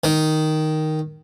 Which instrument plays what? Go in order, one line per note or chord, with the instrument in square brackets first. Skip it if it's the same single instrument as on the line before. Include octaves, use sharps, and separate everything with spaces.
[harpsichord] D#3